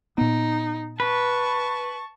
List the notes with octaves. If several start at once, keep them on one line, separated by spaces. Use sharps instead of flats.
A#2 B3 D#4
B4 A5 C#6